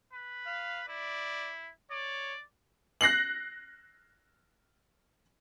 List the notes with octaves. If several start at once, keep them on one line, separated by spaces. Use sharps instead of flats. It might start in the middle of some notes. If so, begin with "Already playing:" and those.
B4
F5
E4 D5
C#5 D5
F#6 A#6 C7 F#7